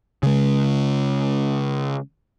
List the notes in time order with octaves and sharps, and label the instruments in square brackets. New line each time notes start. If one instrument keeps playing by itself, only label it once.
[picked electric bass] C#3 G#3